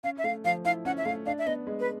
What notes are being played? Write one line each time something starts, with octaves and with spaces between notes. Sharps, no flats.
C#4 F5
E5
A3 F5
F3 F5
E4 F5
C#4 F#5
E5
A3 F5
D4 F5
E5
B3 D#5
G#3
B4